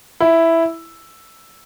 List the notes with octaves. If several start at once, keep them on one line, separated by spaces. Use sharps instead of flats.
E4